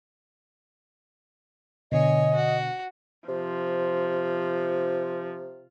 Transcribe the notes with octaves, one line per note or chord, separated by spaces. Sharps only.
B2 D3 C#5 D#5 G#5
F#4
C3 F3